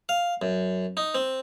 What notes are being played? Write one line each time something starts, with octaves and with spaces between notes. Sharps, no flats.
F5
F#2
D#4
C4